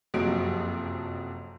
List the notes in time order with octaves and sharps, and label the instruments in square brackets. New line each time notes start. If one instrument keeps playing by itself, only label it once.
[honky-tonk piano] F#1 F2 C3 F3 F#3 D7